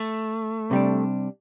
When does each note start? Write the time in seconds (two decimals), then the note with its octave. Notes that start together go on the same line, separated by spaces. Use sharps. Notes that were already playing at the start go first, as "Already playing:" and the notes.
Already playing: A3
0.71 C3 G3 D4